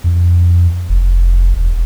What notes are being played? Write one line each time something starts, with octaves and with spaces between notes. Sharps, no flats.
F2
F1
E1